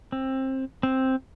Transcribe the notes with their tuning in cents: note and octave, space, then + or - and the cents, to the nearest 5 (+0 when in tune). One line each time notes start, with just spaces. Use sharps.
C4 +20
C4 +5